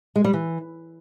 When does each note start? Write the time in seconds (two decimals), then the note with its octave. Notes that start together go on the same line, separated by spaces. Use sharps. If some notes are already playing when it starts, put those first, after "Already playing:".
0.16 G#3
0.24 G3
0.33 E3